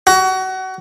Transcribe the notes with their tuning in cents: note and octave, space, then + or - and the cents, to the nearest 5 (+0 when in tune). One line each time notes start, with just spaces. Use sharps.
F#4 +25